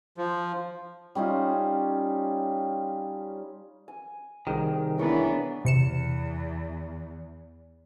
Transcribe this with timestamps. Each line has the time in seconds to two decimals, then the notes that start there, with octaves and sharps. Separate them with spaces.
0.17 F3
1.15 G3 C#4 D#4 F4
3.88 G#5
4.47 C2 D#3 G#4
4.98 E3 B3 D4 A#4 C#5 E5
5.65 E2 C3 C#7 E7